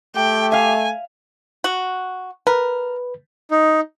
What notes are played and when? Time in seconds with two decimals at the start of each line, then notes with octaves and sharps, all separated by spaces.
0.16 A3 G4 G5
0.52 E5 F5 G#5
1.64 F#4
2.47 A#4 B4
3.51 D#4